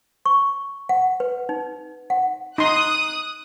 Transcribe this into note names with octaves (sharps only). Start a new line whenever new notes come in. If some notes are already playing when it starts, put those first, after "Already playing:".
C#6
F#5
B4
D#4
F#5
D#4 C6 D#6 F#6